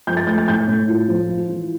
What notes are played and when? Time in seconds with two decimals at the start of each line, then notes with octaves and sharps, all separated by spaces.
0.07 F3 G6
0.17 A6
0.27 A3 G6
0.38 A6
0.48 A2 G6
0.68 A2
0.89 F4
1.09 F3
1.29 F4
1.50 E3